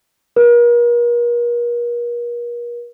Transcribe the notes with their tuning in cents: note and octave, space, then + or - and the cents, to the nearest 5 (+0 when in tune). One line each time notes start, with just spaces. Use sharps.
A#4 +40